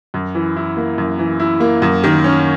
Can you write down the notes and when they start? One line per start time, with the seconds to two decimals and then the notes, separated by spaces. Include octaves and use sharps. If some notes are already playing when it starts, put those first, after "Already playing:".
0.14 F#2
0.35 E3
0.56 E4
0.77 A#3
0.98 F#2
1.19 E3
1.40 E4
1.60 A#3
1.82 F#2
2.04 D#3
2.24 C#4